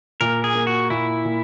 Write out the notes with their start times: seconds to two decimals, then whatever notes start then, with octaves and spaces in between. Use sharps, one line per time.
0.21 A#2 A#4
0.44 G#4
0.55 A#3
0.67 F#4
0.90 A#2 E4
1.25 A#2